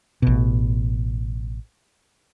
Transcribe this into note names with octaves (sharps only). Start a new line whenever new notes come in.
A1 B2